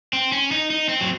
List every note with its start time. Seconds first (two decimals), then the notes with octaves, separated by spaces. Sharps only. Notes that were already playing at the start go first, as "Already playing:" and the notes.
0.13 C4
0.32 C#4
0.52 D#4
0.71 D#4
0.89 C4
1.01 F#3